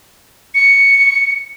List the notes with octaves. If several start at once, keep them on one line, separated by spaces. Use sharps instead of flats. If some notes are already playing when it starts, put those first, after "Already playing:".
C#7